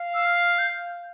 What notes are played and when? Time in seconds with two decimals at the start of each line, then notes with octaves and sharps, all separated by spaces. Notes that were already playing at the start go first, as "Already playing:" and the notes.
Already playing: F5
0.14 E6
0.26 F6
0.59 G6